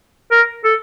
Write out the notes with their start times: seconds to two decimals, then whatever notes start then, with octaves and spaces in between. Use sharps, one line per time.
0.32 A#4
0.65 A4